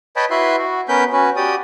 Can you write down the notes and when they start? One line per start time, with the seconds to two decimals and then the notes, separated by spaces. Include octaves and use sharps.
0.16 B4 C#5 D#5 G5 A5 B5
0.31 E4 F#4 B4 E5 C6
0.58 F#4
0.89 B3 C#4 A#4 B4 B5 G6
1.13 C#4 F#4 B4
1.36 F#4 G4 D5 D#6